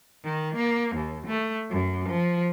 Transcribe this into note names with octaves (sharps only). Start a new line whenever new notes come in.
D#3
A#3
D#2
A3
F#2
F3